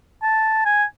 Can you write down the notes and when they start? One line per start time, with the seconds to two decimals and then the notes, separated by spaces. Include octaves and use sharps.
0.22 A5
0.65 G#5